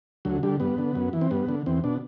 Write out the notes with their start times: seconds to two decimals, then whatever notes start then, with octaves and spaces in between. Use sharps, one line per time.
0.25 D2 F#3
0.43 D3 G3
0.60 G2 B3
0.78 D3
0.95 F#2
1.13 E3
1.21 C4
1.31 G2 B3
1.49 D3
1.66 E2 C4
1.84 B2 D4